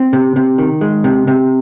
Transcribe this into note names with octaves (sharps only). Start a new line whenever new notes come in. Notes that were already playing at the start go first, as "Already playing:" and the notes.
Already playing: C4
C3
C3
D#3
G#3
C3
C3